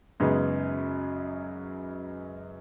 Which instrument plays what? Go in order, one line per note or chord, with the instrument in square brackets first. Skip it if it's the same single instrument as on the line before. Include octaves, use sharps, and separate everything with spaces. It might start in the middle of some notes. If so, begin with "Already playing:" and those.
[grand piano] F#2 C#3 G#3 B3 D#4